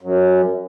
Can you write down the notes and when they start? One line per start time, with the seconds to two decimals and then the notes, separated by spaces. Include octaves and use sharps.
0.01 F#2